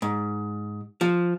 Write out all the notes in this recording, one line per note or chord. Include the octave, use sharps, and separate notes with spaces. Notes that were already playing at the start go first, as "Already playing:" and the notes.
G#2
F3